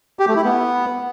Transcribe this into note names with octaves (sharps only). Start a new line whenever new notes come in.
G4
A3
E4
B3